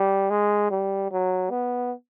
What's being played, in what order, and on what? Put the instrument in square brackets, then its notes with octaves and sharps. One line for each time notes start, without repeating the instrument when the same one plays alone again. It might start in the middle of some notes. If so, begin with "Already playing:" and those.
Already playing: [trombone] G3
G#3
G3
F#3
B3